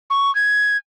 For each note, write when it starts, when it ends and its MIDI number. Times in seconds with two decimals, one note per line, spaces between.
0.10 0.33 85
0.35 0.77 92